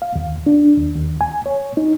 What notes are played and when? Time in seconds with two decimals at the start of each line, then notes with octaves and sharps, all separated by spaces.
0.02 F5
0.16 D#2
0.46 D4
0.78 D#2
0.95 D#2
1.21 G#5
1.46 C#5
1.77 D#4